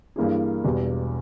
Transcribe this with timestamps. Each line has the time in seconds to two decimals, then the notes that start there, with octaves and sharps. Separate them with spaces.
0.16 G2 E3 A#3 E4 G#4
0.64 E1 E2 B2 G3